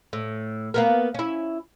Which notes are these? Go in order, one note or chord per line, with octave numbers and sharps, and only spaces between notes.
A2
A#3 B3 A#4
C#4 E4